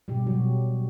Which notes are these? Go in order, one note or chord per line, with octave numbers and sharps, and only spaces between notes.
B2 G3 G4
F#3 F#4
B2